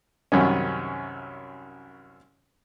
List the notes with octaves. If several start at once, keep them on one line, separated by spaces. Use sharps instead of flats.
C2 F#2 D#3 C#4